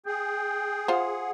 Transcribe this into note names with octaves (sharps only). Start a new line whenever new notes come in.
G#4 G5
F4 C5 F#5